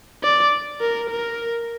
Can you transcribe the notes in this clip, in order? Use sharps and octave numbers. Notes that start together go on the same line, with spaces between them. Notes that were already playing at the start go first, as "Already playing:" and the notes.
D5
A#4
A#4